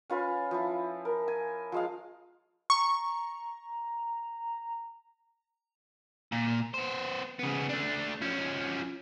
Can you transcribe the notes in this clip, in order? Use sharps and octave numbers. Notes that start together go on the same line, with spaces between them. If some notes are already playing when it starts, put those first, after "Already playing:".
C#4 F4 B4 G#5
F3 E4
A#4
G#5
F3 G#3 F5
A#5 C#6
A#2
B3 C5
C#3 B3
A3 D4
F3 C#4